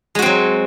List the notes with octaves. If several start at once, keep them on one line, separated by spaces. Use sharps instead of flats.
F#3 G#3 C4 F#4